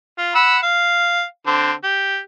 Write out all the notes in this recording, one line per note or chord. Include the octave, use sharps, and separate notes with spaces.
F4
F#5 B5 E6
F5
D3 C4
G4